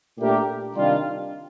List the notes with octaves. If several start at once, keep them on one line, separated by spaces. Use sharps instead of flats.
A#2 A3 D4 G4 A#4
C3 D#3 G3 D4 F4